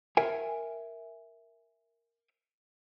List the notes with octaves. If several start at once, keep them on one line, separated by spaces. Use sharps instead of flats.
A#4 E5 G5 G#5